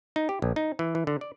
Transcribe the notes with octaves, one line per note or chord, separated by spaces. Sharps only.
D#4
G4
A#1
D#4
E3
E3
D3
D5